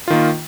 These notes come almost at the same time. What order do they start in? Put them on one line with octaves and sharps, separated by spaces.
F4 D#3 A#3